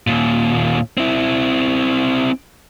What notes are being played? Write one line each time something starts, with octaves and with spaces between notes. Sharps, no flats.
D#2 A#2
C4 E4